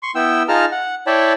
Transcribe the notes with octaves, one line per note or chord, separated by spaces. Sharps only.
C6 C#6
B3 E4 G5 E6
D#4 F4 G#4 A5 A#5 F6
F#5
E4 C#5 D5 G5 A5 B5